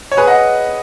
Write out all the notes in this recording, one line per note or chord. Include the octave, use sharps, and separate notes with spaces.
C#5
G#4 B4
D#5 F#5